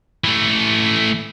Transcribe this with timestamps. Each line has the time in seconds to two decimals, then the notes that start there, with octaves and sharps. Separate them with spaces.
0.24 E3 A3